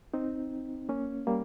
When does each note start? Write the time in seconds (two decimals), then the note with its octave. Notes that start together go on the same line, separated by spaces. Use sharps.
0.14 C4 D#4
0.89 A#3 C#4
1.27 G3 A#3